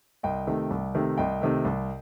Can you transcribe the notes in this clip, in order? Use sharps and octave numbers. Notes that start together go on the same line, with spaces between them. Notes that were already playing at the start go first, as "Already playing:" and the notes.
C2 D#5 G5
C3 D#3 A3
C2
C3 D#3 A3
C2 D#5 G5
C3 D#3 A3
C2